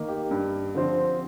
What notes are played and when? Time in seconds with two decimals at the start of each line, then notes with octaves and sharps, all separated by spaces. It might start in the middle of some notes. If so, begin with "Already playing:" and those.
Already playing: D#3 A#3
0.08 G4
0.31 G2
0.74 D3 F3 C4